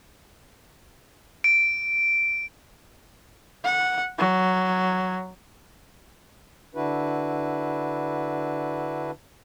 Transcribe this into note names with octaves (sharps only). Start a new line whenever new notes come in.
D7
F#5
F#3
D3 D4 E4 F#4 B4